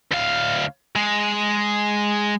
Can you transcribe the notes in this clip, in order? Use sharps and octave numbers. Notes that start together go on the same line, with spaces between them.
D2 F5
G#3